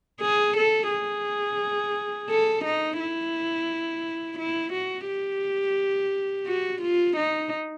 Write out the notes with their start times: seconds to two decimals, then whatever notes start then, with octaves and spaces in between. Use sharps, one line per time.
0.21 G#4
0.57 A4
0.91 G#4
2.30 A4
2.64 D#4
3.00 E4
4.38 E4
4.72 F#4
5.08 G4
6.47 F#4
6.81 F4
7.16 D#4